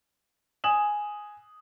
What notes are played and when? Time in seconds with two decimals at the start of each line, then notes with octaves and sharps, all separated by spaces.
0.64 G#5 D#6 E7 F#7